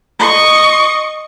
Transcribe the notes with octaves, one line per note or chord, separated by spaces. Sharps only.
D#5 C#6